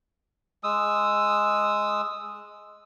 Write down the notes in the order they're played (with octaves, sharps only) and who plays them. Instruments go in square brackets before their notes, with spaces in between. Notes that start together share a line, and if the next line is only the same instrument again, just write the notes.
[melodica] G#3 D#6 E6